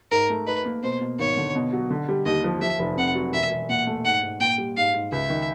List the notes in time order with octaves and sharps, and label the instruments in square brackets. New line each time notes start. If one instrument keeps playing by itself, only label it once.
[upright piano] G#2 [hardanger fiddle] A#4
[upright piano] A3
[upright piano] D#4 [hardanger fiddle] B4
[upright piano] A#3
[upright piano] B2 [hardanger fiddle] C5
[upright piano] B2
[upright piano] G#1 [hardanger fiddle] C#5
[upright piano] D3
B2
F#3
D3
G3
[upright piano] D#2 [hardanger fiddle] D#5
[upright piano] F3
[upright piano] F3 [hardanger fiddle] E5
[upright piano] F1
[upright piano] C3 [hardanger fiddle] F#5
[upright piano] F#3
[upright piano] E1 [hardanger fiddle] E5
[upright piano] E1
[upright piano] A#2 [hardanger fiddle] F#5
[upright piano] A3
[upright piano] G#2 [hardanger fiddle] F#5
[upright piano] G#2
[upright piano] A#2 [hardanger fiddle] G5
[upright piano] G3
[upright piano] G#2 [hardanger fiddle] F5
[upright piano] G#2
[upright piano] C#2 [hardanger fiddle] E5
[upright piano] D#3